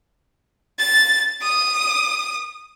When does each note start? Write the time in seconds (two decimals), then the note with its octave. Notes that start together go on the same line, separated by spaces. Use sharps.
0.79 A6
1.43 D#6